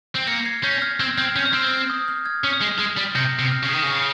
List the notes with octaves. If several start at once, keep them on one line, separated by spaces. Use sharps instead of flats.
C4
A#3 A#6 C#7
G#6 C7
C#4 G6 A#6
F6 G#6
C4 F6 G#6
C4 F6 G#6
C#4 G6
C4 F6
F6
D#6
F6
F6 G#6
C#4
G#3
G#3
G3
C3 G6 A#6
C3
F6
C#3
D#3 D#6
C#3 F6